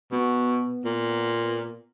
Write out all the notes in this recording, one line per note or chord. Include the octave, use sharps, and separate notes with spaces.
B2 B3
A#2